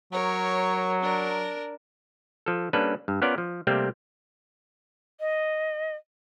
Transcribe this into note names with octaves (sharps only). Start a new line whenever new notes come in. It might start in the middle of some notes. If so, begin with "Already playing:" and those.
F#3 A#4 C#5
D4 A#4
F3 A4
G3 A#3 C#4 D4 A4 B4
G2
B3 C#4 F4 A#4 D5
F3
C3 G3 A3 A#3 C4 G4
D#5